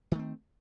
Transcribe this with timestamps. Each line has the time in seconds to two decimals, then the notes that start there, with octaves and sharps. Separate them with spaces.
0.12 D#3
0.15 A3
0.19 C4